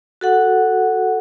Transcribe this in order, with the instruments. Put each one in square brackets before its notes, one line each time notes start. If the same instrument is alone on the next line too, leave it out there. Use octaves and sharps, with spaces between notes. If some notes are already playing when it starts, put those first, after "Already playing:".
[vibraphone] F#4 A4 F#5